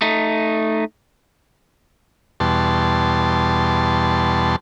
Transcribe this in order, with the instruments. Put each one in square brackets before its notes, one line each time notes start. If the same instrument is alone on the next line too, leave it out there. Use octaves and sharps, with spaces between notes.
[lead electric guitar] A3 D#4
[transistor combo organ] E2 B2 G3 A5 C6